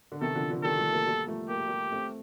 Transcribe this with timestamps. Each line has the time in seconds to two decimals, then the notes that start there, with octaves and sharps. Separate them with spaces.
0.12 D3
0.21 C3 D#3 A4
0.35 D3 F3
0.50 D3 F3
0.64 D#3 G3 A4
0.78 F3 A3
0.92 G3 A#3
1.06 G3 A#3
1.27 F3 A3
1.49 A#3 G4
1.58 A3
1.67 G3 A#3
1.92 A3 C4